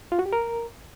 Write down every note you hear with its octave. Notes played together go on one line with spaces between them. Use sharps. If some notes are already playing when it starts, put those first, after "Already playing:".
F4
F#4
G4
A#4